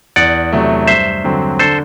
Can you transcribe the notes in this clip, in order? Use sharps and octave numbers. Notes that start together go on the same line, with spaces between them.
E2 D5 F#5
C3 F#3 A3
G2 C5 E5
D3 F#3 C4
D3 A4 C5